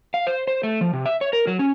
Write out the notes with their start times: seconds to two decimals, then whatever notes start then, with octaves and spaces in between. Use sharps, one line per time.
0.14 F5
0.27 C5
0.47 C5
0.63 A3
0.81 F3
0.93 C3
1.06 E5
1.21 C#5
1.33 A#4
1.47 F#3
1.59 C#4